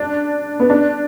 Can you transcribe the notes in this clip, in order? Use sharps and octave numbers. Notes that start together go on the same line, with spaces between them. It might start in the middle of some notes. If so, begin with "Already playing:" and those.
Already playing: D4
B3
D4